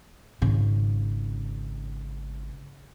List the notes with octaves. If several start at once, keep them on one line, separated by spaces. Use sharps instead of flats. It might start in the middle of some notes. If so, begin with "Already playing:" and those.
G#1 C#3